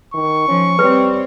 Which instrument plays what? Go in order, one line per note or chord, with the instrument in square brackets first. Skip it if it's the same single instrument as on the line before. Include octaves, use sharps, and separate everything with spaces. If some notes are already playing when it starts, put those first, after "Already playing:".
[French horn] D#3 [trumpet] C#6
[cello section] F3 [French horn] C#4
[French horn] G3 [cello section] C4 C#5 [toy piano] B4